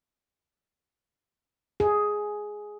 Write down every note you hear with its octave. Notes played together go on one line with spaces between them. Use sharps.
G#4